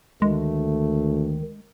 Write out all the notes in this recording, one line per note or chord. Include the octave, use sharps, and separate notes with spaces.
D2 D#3 G#3 A3